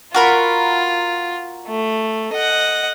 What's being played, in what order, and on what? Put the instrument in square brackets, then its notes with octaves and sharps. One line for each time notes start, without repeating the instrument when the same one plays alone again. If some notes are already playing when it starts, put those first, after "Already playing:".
[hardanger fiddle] F4 [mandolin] F#4 A#4 B5
[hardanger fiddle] A3
D#5 F#5